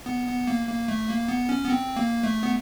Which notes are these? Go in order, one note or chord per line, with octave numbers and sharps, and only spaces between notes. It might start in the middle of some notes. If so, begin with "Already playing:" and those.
B3
B3
A#3
A#3
A3
A#3
B3
C#4
B3
C4
A#3
A3
B3